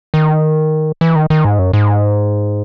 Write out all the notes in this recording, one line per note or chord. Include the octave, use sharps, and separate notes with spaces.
D#3
E3
D#3
D#3
G#2
F#2
G#2